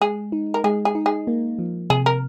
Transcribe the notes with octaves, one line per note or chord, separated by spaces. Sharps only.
G#3 G#4
D#4
A#4
G#3 G#4
G#4
D#4
G#4
A#3
F3
C3 G#4
A#4